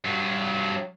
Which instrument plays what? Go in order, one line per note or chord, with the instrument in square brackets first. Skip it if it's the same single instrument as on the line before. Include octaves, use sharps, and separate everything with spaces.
[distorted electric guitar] G2 F#3